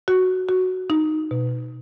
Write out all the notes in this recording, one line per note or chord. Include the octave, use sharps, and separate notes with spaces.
F#4
F#4
D#4
B2